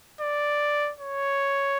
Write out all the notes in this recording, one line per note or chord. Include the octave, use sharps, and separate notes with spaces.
D5
C#5